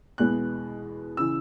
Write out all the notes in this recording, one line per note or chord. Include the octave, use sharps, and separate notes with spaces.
E2 B2 G#3 B3 F#6
C#3 E3 E6